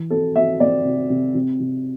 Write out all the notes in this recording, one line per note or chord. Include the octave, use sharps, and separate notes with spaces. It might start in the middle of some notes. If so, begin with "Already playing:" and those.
Already playing: E3
C4 A4
C4 E5
C4 D5
C3
C3
C3
C3